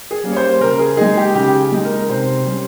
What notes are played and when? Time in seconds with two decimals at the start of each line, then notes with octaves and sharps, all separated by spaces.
0.11 G#4
0.24 G3 A#3 C#4
0.32 C#5
0.36 C5
0.61 C#3 A#4
0.79 G#4
0.97 G#3 D#4 G#4
1.17 G4
1.35 C#3 G4
1.72 G#3 D#4
1.85 A#4
2.09 C3 C5
2.46 G3 C#4